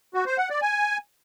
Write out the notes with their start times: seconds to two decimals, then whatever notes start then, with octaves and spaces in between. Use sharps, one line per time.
0.14 F#4
0.26 C5
0.38 F#5
0.50 D5
0.62 G#5